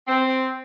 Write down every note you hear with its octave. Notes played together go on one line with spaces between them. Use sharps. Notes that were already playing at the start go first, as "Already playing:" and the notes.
C4